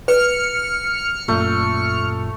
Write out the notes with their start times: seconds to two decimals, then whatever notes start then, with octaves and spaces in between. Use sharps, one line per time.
0.08 B4 F6 C#7
1.28 F#2 A#2 A3